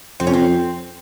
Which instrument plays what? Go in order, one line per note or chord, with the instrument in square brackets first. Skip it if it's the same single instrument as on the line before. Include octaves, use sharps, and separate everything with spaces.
[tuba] F2 [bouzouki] C4
[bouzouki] C#4
C4